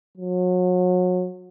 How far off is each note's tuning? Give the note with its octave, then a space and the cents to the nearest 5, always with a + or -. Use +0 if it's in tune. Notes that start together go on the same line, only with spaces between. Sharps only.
F#3 -30